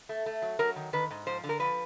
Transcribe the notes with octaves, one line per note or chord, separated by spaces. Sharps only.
A3
A3
F#3
F#3 A#4
D#3
D#3 B4
G#2
F3 C5
D3
A#4
F3 B4